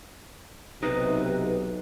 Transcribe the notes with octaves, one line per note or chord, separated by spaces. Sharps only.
B1 C3 D#4 B4